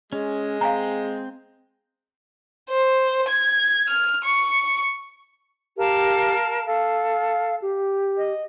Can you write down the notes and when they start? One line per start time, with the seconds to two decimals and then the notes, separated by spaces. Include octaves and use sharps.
0.13 G#3 C#4
0.61 C4 F5 G#5 A#5
2.70 C5
3.29 G#6
3.88 F6
4.24 C#6
5.77 G4 A#4 F5 A5
6.67 A4 F5
7.62 G4
8.16 D#5